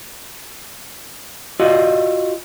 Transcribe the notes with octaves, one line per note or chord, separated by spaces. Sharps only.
F4 F#4 D5 D#5